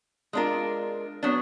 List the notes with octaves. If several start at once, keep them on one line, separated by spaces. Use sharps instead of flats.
G#3 D4 F4 A#4
F#3 B3 D4